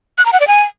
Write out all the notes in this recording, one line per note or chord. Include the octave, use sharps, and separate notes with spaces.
F#6
A#5
F#5
D5
G#5